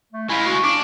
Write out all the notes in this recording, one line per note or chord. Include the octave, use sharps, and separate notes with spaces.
A3
G#3 E4 F4
F#4
D4 D6